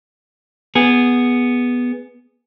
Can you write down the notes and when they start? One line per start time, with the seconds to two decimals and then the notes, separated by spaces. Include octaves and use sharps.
0.75 B3 G#4